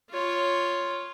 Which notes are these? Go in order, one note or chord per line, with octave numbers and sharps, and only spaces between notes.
F4 C#5